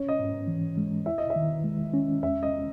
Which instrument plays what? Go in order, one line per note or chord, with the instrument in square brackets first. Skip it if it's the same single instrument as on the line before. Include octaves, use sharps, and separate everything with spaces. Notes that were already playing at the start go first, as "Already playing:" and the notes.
Already playing: [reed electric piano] C#4 [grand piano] C#5
[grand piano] D#5
[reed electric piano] G#2
E3
G#3
[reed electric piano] E4 [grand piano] E5
[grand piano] D#5
E5
[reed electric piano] D#3
G#3
C#4
[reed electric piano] E2 [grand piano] E5
[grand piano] D#5